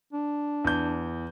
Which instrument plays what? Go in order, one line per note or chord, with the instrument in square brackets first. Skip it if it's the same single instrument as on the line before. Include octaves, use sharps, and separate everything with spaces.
[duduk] D4
[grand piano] E2 G6